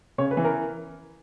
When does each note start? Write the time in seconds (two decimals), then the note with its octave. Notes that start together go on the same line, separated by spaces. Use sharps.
0.18 C#3 C#5
0.31 B4
0.37 E3
0.45 A#4